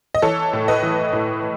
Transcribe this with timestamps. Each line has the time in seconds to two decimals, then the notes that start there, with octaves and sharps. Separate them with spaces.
0.15 D#5
0.22 E3 A4 C#5
0.53 A2
0.68 B4 D#5
0.83 E3
1.13 A2